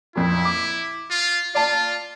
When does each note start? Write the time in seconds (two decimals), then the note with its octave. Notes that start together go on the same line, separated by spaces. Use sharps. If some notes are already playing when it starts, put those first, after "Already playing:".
0.15 F2 A#2 E4
0.45 D6
1.10 F4
1.55 F4 D5 A5